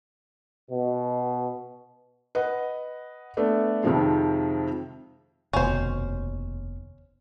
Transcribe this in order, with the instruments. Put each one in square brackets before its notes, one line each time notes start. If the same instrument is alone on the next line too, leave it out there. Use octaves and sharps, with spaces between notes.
[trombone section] B2
[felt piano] B4 D#5 F#5
A3 B3 D4
F2 C3 D#3 F3 G#3
[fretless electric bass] F1 D#2 B2 [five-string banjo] C#4 C5